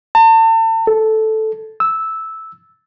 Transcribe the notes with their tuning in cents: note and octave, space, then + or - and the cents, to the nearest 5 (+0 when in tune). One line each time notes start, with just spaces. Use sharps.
A5 +40
A4 -5
E6 -10